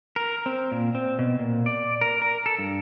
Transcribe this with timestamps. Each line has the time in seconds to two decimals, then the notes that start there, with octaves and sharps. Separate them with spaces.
0.16 A#4
0.46 C4
0.72 A#2
0.95 C4
1.19 B2
1.39 A#2
1.66 D5
2.01 A#4
2.22 A#4
2.46 A4
2.59 G2